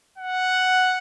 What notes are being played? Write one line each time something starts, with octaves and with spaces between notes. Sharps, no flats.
F#5